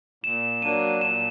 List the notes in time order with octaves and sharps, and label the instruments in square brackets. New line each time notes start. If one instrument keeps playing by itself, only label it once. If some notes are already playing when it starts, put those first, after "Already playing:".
[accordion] A#2 [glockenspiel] E7
[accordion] F#3 A#3 D4 [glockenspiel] D#7
[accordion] A#2 [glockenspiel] E7